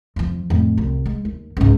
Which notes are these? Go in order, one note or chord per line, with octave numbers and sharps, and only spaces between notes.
F2 F3
F2 A2
C2
G#3
D#2
C#2 G#2